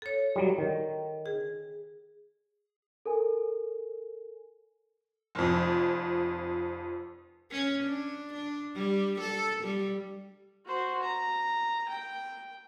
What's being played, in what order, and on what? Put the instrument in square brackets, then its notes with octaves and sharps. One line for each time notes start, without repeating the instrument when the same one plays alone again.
[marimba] A4 C#5
[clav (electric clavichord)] F#3 G3
D#3
[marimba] G#4
[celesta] A4 A#4 G#5
[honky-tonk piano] F1 F2
[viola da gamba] C#4
D4
D4
G3
A4
G3
[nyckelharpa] F#4 C5
A#5
G5